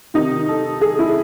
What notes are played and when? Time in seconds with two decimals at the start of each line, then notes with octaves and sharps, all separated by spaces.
0.14 C3 D#3 D#4
0.49 A4
0.81 G#4
0.99 E4